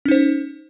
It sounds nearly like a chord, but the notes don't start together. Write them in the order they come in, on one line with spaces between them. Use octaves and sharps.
C#4 D#4 C5